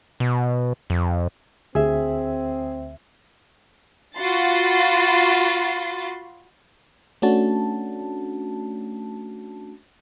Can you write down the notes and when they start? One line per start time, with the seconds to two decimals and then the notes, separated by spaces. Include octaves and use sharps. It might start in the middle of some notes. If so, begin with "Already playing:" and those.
0.20 B2
0.90 F2
1.75 D2 C4 G#4 E5
4.16 F4 F#4 B5 C6 A6
7.22 A3 C#4 D4 F#4 A5